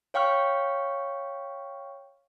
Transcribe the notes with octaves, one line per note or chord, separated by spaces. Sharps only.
C#5 F5 G5 C#6 F6